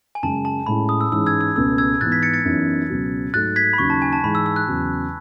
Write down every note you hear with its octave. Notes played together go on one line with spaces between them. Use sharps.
G#5
F#2 C#3 G#3 A5
A5
A2 G#3 C#4 B5
D#6
E6
G#2 E3 G#3 C#4 E6
E6 G#6
E6
C#2 B2 A3 E6
E6 G#6
G#2 E3 B3 F#6 A6
G#6 B6
A6 C#7
A6 C#7
F#2 E3 B3 D#4
C#2 B2 F#3
G#2 F#3 A3 D#4 F#6 A6
G#6 B6
B5
D#2 C#3 F#3 C#6
A5
G#5
A5
G#2 E3 G#3 B5
E6
E6
F#6
E2 C#3 F#3